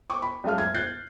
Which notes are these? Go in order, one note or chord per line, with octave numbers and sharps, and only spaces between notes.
C#6 D6
B5
F#2 G#3 A3 F5 F6
G#6
F#6 G6 A6 C7